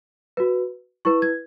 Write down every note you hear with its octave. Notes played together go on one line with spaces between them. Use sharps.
F#4 B4
E4 B4 C#6
G#6